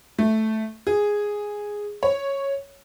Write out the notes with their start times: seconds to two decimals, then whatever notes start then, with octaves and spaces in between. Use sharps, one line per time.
0.19 A3
0.87 G#4
2.03 C#5